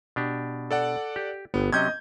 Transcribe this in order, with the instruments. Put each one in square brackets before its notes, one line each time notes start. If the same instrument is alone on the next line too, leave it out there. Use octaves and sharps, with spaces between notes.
[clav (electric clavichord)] B2 D4 G4
[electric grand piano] A4 D5 F#5
[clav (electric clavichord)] G4
[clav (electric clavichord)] G1 G5 [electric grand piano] B3
[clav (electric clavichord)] C3 F#3 C#4 [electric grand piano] D#5 G6 G#6